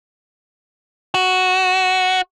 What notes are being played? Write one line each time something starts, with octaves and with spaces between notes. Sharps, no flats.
F#4